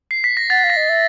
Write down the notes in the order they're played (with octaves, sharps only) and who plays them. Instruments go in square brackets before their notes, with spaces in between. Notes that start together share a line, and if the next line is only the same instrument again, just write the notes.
[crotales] C7
B6
A#6
[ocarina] F#5 [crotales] A6
[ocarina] F5
[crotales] A#6
[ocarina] D#5
E5